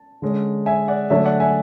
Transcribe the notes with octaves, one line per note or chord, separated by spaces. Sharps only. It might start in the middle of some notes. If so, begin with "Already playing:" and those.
Already playing: A5
D3 G#3 C#4
E5 G#5
D5 F#5
D3 F#3 A3 D4 C#5 E5
D5 F#5
E5 G#5